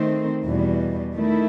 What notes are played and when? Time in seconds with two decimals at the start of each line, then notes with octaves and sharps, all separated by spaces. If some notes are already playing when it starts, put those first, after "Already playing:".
Already playing: D#3 A3 C4
0.43 E2 B2 G3
1.14 D#3 A3 E4